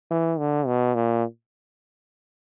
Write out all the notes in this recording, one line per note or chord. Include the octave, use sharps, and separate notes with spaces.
E3
D3
B2
A#2